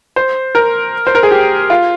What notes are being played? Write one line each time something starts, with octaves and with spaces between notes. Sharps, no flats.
C5
A#4
C5
A#4
G#4
G4
F4